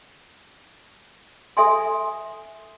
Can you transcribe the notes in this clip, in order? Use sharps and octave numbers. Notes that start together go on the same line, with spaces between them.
A4 E5 G#5 C6